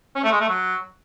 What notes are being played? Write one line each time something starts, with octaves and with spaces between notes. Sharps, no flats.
C#4
A3
G#3
A3
F#3